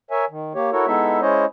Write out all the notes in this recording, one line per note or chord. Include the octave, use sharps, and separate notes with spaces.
A#4 C#5 E5 G#5
D#3
A#3 G4 C#5
E4 F#4 A4 A#4 C#5
G#3 B3 D#4 E4 A4 E5
G#3 C#4 E4 C5 C#5 D#5